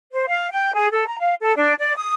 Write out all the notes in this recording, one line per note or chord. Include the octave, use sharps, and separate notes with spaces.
C5
F5
G5
G#4
A4
A#5
F5
A4
D4
D5
D#6